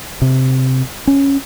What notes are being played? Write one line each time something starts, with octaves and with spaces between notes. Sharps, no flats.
C3
C#4